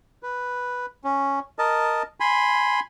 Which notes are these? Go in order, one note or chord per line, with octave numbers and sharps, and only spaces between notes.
B4
C#4
A#4 D#5 A5
G#5 B5 C6